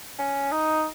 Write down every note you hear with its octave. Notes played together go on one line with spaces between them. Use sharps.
C#4
D#4